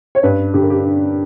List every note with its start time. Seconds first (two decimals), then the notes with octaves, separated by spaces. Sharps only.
0.15 C#5
0.23 G2 B4
0.54 D3 G4
0.63 A#4
0.70 G4
0.85 D4